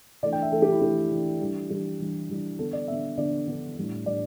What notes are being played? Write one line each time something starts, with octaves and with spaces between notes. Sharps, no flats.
E3 A3 D4 D5
G5
E5
E3 A3 D4 A4
G4
E4
E3 A3 D4 G4
E3 A3 D4
E3 G3 D4
E3 G3 D4 G4
E3 G3 D4
E3 G3 D4
D3 B3 D4 A4
D5
D3 B3 D4 E5
D3 B3 D4 D5
D3 B3 D4
A2 G3 D4
A2 G3 D4 D5